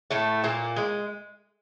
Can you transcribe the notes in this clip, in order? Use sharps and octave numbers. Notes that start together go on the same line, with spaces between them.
A2 A3
A#2 A#3
G#3